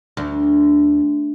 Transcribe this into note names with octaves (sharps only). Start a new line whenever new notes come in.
D2